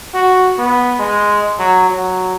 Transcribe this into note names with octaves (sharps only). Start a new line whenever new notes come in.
F#4
B3
G#3
F#3
F#3